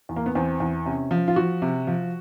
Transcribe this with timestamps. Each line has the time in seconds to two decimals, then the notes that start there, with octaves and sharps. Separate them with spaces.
0.09 E2
0.16 A#3
0.26 B3
0.35 E2 C4
0.60 E2
0.86 C3 C#4
1.11 F3
1.28 F4
1.36 F3 F#4
1.62 C3
1.87 F3